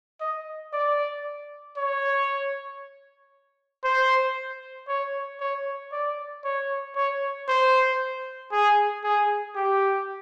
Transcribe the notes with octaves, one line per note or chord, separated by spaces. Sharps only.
D#5
D5
C#5
C5
C#5
C#5
D5
C#5
C#5
C5
G#4
G#4
G4